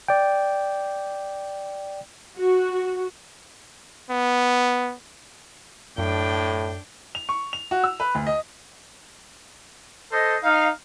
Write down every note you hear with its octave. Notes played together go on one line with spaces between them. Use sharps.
D5 G5
F#4
B3
F#2 A2 D4 G5
F7
C#6
F7
F#4
E6
B4
D2
D#5
A4 C5 D#5
D#4 F5